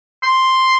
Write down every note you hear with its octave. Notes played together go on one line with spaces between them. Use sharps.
C6